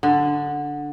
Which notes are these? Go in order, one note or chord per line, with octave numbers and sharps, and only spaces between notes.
D3